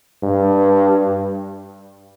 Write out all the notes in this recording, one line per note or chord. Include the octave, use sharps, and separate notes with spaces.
G2